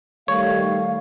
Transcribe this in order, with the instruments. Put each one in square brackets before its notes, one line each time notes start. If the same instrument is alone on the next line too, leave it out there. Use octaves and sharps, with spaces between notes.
[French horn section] D#3 G3 A3 [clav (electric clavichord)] C#5 [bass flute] F5